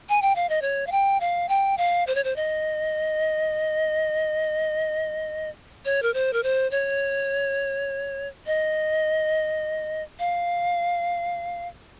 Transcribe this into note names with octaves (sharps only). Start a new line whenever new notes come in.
G#5
G5
F5
D#5
C#5
F5
G5
F5
G5
F5
C5
C#5
C5
D#5
C#5
A#4
C5
A#4
C5
C#5
D#5
F5